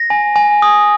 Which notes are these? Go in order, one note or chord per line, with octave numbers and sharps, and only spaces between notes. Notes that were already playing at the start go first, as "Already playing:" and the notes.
Already playing: A#6
G#5
G#5
D#6